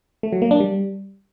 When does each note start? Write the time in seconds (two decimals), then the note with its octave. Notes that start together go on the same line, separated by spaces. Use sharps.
0.23 A3
0.33 F#3
0.42 A#3
0.51 D4
0.60 G3